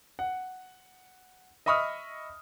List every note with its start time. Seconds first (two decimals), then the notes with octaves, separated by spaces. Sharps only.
0.19 F#5
1.66 D#5 E5 B5 C#6 D#6 F6